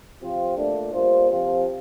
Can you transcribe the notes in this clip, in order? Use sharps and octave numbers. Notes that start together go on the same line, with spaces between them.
C3 F3 C4 F4
A#2 A3 D4
G3 A#3 F4 C5
C3 F3 C4 F4